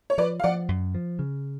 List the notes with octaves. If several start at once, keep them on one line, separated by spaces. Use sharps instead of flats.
C#5
F3 B4 D5
F5
F3 D5 F#5
F#2
F3
C#3